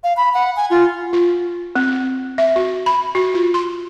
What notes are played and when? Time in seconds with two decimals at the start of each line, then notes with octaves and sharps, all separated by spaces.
0.04 F5
0.17 B5
0.34 F#5
0.56 G#5
0.70 F4
1.13 F4
1.76 C4
2.38 E5
2.56 F#4
2.86 B5
3.15 F#4
3.34 F4
3.54 C6